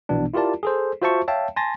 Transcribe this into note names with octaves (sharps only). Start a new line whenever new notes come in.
A#1 B2 E3 B3 D4
E4 F4 G4 A#4 D5 A5
G#4 A4 C5
F4 F#4 C5 E5 A5 C#6
C#5 E5 F5 G5 A5
G#5 A5 C6 A6 A#6